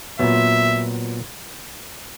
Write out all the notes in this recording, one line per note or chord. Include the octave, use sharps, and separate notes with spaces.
A#2 F#3 B3 E5